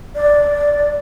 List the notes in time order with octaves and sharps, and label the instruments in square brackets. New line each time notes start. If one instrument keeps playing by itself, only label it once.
[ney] D5